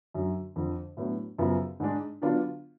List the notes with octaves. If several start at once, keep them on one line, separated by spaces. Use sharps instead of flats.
F#2 D3 F#3
F2 D3 F3
A2 F#3 B3 D4
F#2 C#3 F3 B3 F4
G#2 G#3 D4
D3 F#3 B3 D4 F4